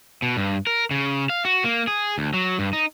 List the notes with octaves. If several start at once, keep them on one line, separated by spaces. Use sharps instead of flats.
B2
G2
A#4
C#3
F5
F#4
A#3
G#4
D2
F#3
G2
D#4